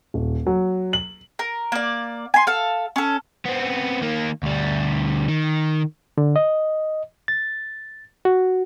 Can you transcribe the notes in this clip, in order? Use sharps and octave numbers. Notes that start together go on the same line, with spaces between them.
D#1
F#3
F#7
A#4
A#3 D5
G#5 C6
A4 F5
C#4 A4
B3 C4
D#3 A#3
D2 G3
D#3
D3
D#5
A6
F#4